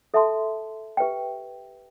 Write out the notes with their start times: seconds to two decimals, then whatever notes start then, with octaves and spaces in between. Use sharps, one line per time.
0.14 A4 E5 A5 C6
0.97 G4 B4 E5 G5